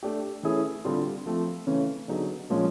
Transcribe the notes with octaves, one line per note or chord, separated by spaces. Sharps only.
A3 D4 G4
E3 A3 C#4 E4 G#4
D3 G3 C4 F4
F3 A3 C4
C#3 E3 A3 C#4
D3 F#3 B3 D#4 G#4
A#2 F3 G#3 C#4